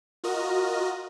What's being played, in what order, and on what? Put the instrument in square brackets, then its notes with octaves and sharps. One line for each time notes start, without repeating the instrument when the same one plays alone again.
[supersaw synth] F4 F#4 A#4 D#5